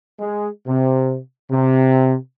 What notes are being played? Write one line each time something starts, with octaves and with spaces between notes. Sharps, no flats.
G#3
C3
C3